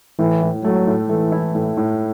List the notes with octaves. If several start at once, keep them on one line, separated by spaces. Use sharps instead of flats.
A2 E3
A2
F#3 A3
A2
E3 A3
E4
A2
A2